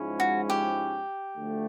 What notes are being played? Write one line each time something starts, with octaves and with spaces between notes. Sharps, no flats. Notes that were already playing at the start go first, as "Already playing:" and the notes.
Already playing: G#2 F3 G#3 C#4 E4
F#4
G4
D2 D3 F3 A3